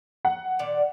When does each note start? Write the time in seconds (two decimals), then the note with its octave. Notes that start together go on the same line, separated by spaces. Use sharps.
0.25 F#5
0.59 A#2 D#3 D5